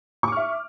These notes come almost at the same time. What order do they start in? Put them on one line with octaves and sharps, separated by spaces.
C#6 D6 F6 E5